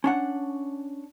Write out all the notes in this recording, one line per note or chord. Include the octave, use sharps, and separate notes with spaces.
C#4 D4 F#5